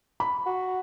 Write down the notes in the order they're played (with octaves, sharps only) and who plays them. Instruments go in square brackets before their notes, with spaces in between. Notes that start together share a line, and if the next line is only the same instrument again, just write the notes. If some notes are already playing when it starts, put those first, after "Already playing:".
[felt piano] B5
[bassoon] F#4